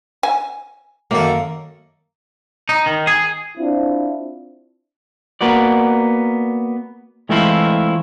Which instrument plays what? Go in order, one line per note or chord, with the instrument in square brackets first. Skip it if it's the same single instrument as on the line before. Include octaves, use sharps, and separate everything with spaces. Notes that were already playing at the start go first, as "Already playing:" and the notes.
[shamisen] G#5
[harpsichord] F#2 D#3 A4 [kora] A#3
[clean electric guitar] D#4
D#3
G#4
[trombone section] C4 D4 E4 F4
[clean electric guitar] A#3 B3 F#4 D5
E3 G#3 A3 C4 E4 F4